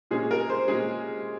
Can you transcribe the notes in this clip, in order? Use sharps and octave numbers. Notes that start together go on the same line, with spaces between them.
A#2 G#3 C#4 G#4
A#4
C5
A#2 G#3 C#4 G#4